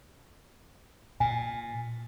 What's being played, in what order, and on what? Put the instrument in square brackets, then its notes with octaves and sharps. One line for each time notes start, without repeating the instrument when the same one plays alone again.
[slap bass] A#2 [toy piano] G#5